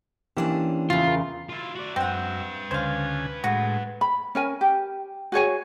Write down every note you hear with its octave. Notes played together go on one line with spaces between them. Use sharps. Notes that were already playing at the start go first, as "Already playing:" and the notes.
E3 A#3 C#4 D4 G4 C5
E2 C#3 F4
A#4
E4 F4
F#4 D5
F#2 C4 B4 E5 F#5 G5
D2 C#3 C5 F5 G#5
A2 G#3 F#4
B5
C#4 A#4 G#5
G4
F#4 G#4 C#5 G#5